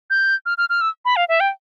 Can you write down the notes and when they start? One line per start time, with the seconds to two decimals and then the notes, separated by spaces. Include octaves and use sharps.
0.10 G6
0.46 F6
0.58 F6
0.70 F6
0.81 E6
1.05 B5
1.16 F5
1.29 E5
1.40 G5